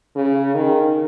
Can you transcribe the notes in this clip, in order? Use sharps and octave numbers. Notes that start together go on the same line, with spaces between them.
C#3
D#3